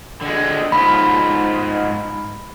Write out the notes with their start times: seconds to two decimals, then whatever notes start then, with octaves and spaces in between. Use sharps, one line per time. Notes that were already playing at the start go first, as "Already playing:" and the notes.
0.22 D3 G#3
0.72 G#2 F4 B5